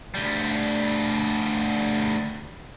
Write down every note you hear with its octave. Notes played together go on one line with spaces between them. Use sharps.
D2 G3